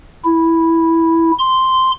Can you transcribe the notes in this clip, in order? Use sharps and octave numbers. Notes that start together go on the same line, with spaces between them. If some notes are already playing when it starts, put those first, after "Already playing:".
E4
C6